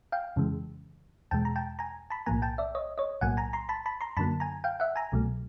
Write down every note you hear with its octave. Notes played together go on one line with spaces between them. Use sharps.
F5 G5
F2 C#3 E3 G#3
E2 B2 G#3 G5 A5
A#5
G5 A5
G#5 A#5
A5 B5
B1 A2 F3 A#3 G#5 A#5
G5 A5
D5 E5
C#5 D#5
C#5 D#5
B1 A2 F#3 A#3 F#5 G#5
G#5 A#5
A#5 C6
A5 B5
A5 B5
A#5 C6
F#2 D3 F#3 A#3 A5 B5
G#5 A#5
F5 G5
E5 F#5
G#5 A#5
C2 B2 F#3 A3